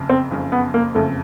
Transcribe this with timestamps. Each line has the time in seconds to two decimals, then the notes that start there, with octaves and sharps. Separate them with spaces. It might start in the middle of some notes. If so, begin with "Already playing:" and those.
Already playing: F#1 F2 C#3
0.09 C4
0.31 F#1 F2 C#3
0.52 B3
0.74 A#3
0.95 F#1 F2 C#3 A3